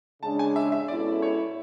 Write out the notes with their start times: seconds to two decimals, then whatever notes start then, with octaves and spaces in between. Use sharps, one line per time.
0.23 C#3 G#3 D4 A5
0.39 G#5
0.56 E5
0.72 E5
0.88 B2 G#3 C#4 E4 A4 D5
1.22 C#5